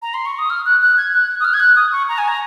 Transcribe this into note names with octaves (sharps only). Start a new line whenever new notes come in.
A#5
C6
C#6
D#6
F6
F#6
F#6
G#6
F#6
D#6
F6
G#6
F#6
D#6
C#6
A#5
G#5
A#5